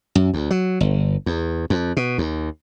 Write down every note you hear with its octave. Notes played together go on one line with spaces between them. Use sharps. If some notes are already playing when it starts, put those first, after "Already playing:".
F#2
D2
F#3
G1
E2
F2
B2
D#2